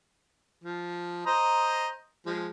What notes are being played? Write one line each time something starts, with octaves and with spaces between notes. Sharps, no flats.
F3
C5 D#5 A#5
F3 G#3